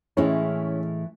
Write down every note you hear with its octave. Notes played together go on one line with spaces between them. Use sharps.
A2 E3 G#3 C#4 E4